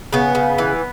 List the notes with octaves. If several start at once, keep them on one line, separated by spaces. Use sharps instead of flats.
C#3 B3
C#3
E3